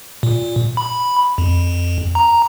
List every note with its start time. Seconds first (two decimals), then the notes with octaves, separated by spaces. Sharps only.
0.23 A#2
0.77 B5
1.38 F2
2.15 A#5